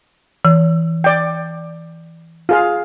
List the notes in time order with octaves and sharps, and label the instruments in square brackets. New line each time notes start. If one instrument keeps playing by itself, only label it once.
[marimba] E3
[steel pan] D5 G5
F4 G#4 F5